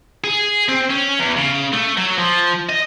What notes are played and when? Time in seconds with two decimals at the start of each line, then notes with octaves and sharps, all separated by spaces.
0.24 G#4
0.68 C4
0.90 C#4
1.19 E2
1.37 C#3
1.72 A3
1.97 F#3
2.18 F3
2.69 D#5